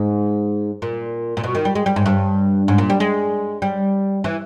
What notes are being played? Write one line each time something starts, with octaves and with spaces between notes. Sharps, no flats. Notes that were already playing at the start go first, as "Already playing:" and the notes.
Already playing: G#2
A#2
A#2
B2
D#3
G3
G#3
G3
G#2
G2
G#2
A#2
G3
G#3
G3
E3